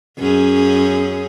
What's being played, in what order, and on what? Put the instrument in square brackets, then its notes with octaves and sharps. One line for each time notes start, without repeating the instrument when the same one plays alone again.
[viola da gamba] F#2 C#4 G#4